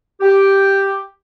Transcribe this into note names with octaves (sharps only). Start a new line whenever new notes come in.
G4